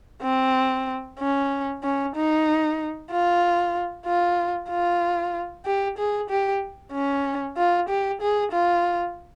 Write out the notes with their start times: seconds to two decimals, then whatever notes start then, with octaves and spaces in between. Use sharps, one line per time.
0.23 C4
1.19 C#4
1.83 C#4
2.15 D#4
3.11 F4
4.06 F4
4.70 F4
5.65 G4
5.98 G#4
6.29 G4
6.92 C#4
7.57 F4
7.89 G4
8.21 G#4
8.52 F4